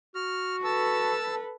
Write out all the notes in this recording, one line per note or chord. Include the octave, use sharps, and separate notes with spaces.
F#4 F6
A4 B4 A5 E6